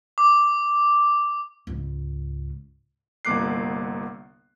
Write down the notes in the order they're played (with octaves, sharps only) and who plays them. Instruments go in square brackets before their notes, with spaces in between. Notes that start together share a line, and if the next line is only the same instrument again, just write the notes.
[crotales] D6
[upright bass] C#2 G#2
[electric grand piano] G1 C2 A#3 D6 F#6 C7